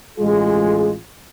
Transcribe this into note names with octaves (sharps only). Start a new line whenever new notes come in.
A1 G#3 F4 G#4